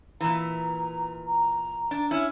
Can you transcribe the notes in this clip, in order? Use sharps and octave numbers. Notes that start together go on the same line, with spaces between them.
A#2 E3 A#5
A#5
D4
C#4 E4